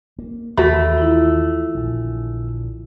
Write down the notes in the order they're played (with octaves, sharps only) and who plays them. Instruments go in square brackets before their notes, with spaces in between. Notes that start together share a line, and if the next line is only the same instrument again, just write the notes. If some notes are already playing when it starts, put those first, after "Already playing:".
[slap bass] A#3
[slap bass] D#2 [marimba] E3 B5 [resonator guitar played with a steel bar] A3 [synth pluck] F#4 A#5
[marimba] E4 F4
[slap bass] A#1 D3